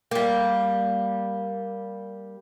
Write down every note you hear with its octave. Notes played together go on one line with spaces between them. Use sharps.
G3 A#3